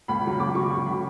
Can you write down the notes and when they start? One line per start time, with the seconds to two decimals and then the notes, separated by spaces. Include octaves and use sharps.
0.08 C#2 B5
0.25 C#3 F#3
0.40 C#2 D6
0.55 C#3 F#3 C#6
0.71 C#2 C#6
0.86 C#3 F#3 B5